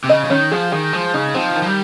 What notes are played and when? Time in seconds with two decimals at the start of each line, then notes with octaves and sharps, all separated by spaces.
0.04 C3
0.09 C#3 D#5
0.25 C#3
0.30 D#3 C#4
0.51 F3 G#4
0.72 D#3 G#4
0.93 F3 G#3
1.14 C#3 D#4
1.34 F3 C4
1.56 D#3
1.62 F3
1.66 G3